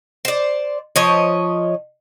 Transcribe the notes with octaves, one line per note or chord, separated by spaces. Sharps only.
C5 D5
F3 C#5 D#5